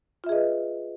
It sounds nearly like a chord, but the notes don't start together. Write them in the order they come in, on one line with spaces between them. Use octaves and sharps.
F4 E5 G#4 D#5 B4